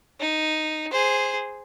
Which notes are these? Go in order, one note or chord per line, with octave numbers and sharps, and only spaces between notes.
D#4
G#4 C5